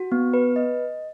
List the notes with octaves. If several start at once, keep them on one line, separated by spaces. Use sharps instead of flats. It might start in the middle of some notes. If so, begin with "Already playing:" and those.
Already playing: F#4
B3
B4
D#5